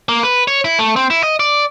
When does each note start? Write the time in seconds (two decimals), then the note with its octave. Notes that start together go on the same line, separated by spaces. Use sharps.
0.09 A#3
0.23 B4
0.48 C#5
0.64 E4
0.79 A3
0.96 C4
1.10 E4
1.23 D#5
1.40 D5